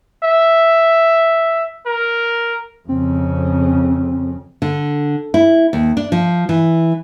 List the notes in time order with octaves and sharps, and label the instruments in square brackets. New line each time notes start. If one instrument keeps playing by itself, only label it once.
[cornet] E5
A#4
[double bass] F2 C#3 [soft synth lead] C4
[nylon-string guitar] D3
E4
D#2
D4
F3
E3